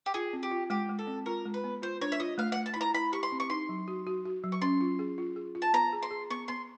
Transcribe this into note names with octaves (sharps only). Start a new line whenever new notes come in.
G4
F4 G#4
C4
G4
F4
G#3 G4
G#3
A4
C4
F4 A#4
G#3
B4
B3
F4 C5
D4 C#5
E5
F4 D#5
A3 F5
A3 F#5
A5
B5
E4 A#5
E4 B5
G4 C#6
C6
C4
C#6
D#4 C6
F#3
F#4
F#4
F#4
F#3
C#6
C#4 C6
F4
G#4
F4
G#4
F4
A5
B3 A#5
G#4
C6
G#4
B3 C#6
B3 C6